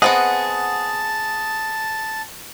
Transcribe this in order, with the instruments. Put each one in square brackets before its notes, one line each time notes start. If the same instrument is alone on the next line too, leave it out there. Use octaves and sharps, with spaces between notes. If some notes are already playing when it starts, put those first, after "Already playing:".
[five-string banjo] B3 C4 D#5 [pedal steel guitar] G#4 [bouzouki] F#5 [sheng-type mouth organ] A5